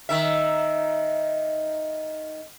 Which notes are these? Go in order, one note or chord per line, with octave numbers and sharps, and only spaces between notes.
D#3 E5